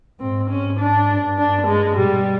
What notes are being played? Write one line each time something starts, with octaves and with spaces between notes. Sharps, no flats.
G#2 C4
G#2 C#4
D4
G2
D4
G#3
B2 G3